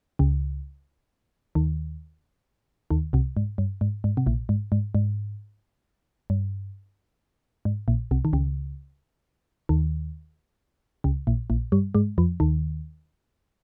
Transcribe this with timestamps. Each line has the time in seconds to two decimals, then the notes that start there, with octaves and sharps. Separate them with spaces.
0.19 C#2 C#3
1.55 D#2 D#3
2.91 D#2 D#3
3.13 C2 C3
3.37 G#2
3.58 G2
3.81 G#2
4.04 G#2
4.17 C3
4.26 A#1 A#2
4.49 G#2
4.72 G#2
4.95 G#2
6.30 G2
7.65 G#2
7.88 A#1 A#2
8.11 C2 C3
8.25 D#3
8.33 C#2 C#3
9.69 D#2 D#3
11.04 C#2 C#3
11.27 A#1 A#2
11.50 A#1 A#2
11.72 G2 G3
11.95 G#2 G#3
12.18 F2 F3
12.40 D#2 D#3